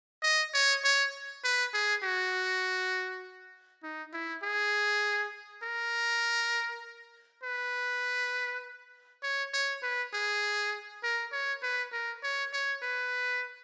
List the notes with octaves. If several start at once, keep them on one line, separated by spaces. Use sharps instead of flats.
D#5
C#5
C#5
B4
G#4
F#4
D#4
E4
G#4
A#4
B4
C#5
C#5
B4
G#4
A#4
C#5
B4
A#4
C#5
C#5
B4